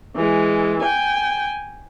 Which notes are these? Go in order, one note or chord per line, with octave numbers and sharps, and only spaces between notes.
E3 G#3
G5 G#5